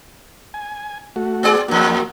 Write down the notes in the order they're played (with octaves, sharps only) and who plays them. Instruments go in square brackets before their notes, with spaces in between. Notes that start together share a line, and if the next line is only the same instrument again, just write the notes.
[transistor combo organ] G#5
A3 F#4
[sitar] B3 G#4 D5
[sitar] E2 G2 [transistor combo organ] A#3 F#4